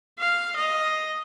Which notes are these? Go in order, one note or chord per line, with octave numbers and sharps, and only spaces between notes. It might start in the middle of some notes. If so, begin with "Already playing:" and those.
F5
D#5